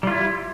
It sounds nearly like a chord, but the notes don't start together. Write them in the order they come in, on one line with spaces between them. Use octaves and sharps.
G3 F4 E4